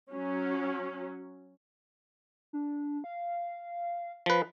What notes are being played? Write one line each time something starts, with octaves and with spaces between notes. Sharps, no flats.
F#3 C#4
D4
F5
F3 B4